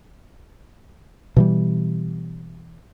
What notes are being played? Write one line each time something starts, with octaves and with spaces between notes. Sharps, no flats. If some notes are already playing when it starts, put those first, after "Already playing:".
B2 E3 G3